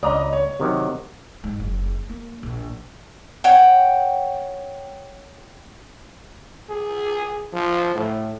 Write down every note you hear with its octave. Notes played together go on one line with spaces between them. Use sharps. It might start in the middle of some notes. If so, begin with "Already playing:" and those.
C#2 D5 D#5 A#5 D#6
C#5
C3 D#3 F#3
G#2
F#1
A#3
A#1
C#5 F#5 G5
G#4
F3
A2